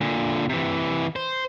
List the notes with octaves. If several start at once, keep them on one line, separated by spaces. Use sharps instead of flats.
A#2 D3
C3 E3
C5